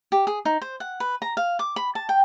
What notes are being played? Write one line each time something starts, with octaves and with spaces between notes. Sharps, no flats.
G4
G#4
D#4
C5
F#5
B4
A#5
F5
D6
B5
A5
G5